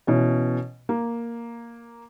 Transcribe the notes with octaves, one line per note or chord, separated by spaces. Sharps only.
B2 E3 C#4
A#3